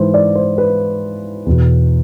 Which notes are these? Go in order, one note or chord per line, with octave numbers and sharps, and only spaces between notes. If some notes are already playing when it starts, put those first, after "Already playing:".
Already playing: G#2 E3 B4 C5
D5
C5
B4
E2 B2